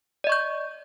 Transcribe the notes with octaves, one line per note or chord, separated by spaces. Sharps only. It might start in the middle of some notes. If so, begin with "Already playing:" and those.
D5 D#5 C#6 G6